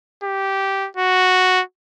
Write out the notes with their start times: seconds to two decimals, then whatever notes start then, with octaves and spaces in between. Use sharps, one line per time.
0.23 G4
0.97 F#4